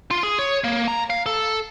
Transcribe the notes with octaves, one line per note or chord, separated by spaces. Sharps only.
F4
G#4
C#5
A#3
A#5
F5
A4